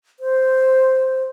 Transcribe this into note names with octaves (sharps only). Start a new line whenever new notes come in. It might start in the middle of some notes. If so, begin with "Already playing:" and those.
C5